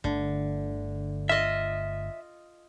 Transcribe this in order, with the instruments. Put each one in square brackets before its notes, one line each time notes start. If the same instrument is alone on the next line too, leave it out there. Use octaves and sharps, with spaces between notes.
[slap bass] G1 A3 [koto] D3
[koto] F4 D#5 [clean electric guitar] E5